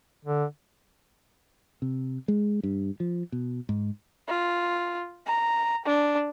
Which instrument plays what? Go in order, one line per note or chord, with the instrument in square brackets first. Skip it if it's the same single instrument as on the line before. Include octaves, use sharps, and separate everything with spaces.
[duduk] D3
[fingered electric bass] C3
G#3
G2
F3
B2
G#2
[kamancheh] F4
A#5
D4